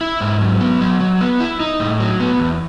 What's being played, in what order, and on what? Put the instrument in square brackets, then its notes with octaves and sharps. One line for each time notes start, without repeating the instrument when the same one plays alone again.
[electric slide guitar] E4
G#2
F#3
B3
F#3
F#3
B3
E4
D#4
A2
F#3
B3
E2